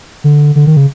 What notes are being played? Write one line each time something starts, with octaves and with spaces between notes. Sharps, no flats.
D3
D3
D#3
C#3